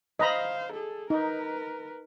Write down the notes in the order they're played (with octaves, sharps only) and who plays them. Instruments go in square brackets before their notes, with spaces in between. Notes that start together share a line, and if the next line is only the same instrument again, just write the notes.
[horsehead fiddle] C5 F5 [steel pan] D#5 A#5 B5
[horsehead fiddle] G#4 A4
[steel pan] D#4 [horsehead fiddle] A#4 B4